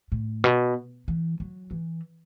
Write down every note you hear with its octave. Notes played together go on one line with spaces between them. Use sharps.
A2
B2
E3
F#3
E3